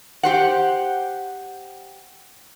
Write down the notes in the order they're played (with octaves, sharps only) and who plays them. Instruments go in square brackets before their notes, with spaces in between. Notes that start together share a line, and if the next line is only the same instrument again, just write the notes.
[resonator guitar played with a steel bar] G4 C5 F#5